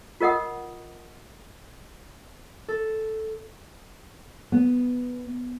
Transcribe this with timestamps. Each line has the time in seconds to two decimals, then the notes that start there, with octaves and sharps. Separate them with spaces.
0.21 F4 A#4 D#5 F#5 D#6
2.68 A4
4.52 B3